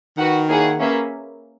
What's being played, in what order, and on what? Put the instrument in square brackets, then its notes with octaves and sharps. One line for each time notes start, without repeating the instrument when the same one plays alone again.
[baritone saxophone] D#3 [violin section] F#4 B4 F#5
[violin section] A#3 E4 G#4 C#5 F#5
A#3 C#4 G#4 B4 E5